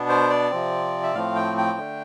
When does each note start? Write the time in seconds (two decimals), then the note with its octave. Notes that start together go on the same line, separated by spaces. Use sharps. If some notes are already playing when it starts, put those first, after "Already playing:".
Already playing: B2 B3 D4
0.09 C5
0.30 D5
0.51 C3 F3 C4
1.03 E5
1.14 A2 F3 A3 C4 F5
1.36 G5
1.58 G5
1.78 D3 A3 D4